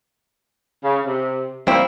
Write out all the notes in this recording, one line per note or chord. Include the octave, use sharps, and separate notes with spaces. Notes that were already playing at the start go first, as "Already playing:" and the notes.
C#3
C3
G3 A#3 C4 E4